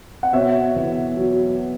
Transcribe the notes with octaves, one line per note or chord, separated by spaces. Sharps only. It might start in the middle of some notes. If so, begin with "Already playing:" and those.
F#5
B2 C#5 E5
E2
F#3